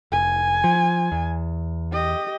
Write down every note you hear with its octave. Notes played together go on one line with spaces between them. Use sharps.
F1 G#5
F3
E2
G4 D#5